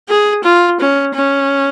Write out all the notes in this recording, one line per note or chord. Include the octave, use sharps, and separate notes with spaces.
G#4
F4
C#4
C#4